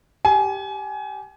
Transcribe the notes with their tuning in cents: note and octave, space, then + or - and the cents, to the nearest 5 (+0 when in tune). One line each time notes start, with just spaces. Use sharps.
G4 -5 G#5 +25